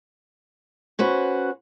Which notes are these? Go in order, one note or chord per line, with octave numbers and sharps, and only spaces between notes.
C#4 F#4 B4 C5